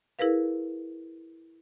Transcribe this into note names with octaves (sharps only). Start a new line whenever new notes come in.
E4 G#4 A#4 B4 F5